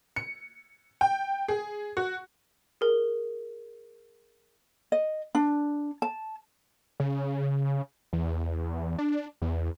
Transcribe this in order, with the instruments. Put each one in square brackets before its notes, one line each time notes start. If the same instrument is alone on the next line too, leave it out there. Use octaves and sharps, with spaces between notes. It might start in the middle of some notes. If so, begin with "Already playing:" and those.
[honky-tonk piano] C#7
G5
G#4
F#4
[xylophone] G#4 A#4
[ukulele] D#5
D4
A5
[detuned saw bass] C#3
E2
D4
E2